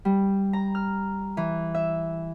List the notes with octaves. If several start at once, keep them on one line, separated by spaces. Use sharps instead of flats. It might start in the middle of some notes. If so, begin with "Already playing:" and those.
G3
A#5
F6
E3
E5